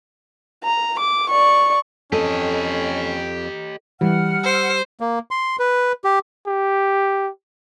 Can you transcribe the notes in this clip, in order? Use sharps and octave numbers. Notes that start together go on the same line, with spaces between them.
A#5
D6
D5 C#6
F2 C#4 G4 A4 D#5
E3 G3 F#5 F6
C5 E6
A#3
C6
B4
G4
G4